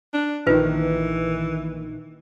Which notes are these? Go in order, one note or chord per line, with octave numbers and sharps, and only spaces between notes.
D4
A#1 D#3 E3 F4 B4